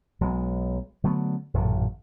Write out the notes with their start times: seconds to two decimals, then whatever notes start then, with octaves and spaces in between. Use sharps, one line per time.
0.21 B1 F#3 G#3
1.04 D3 F#3 A3 B3
1.54 A1 F#2 A#2 D3